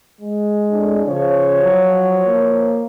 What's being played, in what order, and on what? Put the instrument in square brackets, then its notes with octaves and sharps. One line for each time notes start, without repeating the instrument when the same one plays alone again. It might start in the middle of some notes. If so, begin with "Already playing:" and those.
[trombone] G#3
[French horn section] F2 A2 D4
[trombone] C#3 [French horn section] F3 C#5
[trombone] F#3
A#3